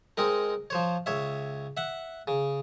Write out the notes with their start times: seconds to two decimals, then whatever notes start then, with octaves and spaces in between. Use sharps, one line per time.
0.17 G#3 C4 D#4 A#4
0.70 F3 C5 C#5
1.06 C#2 C#5 E5
1.77 E5 F#5
2.28 C#3